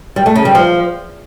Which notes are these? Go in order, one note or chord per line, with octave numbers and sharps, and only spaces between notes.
G3
A3
C#3
G3
F3